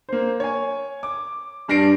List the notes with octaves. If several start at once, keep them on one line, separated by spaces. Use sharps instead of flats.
A#3 C5
C#5 G#5
D6
G2 G3 D4 A#6 C7 D7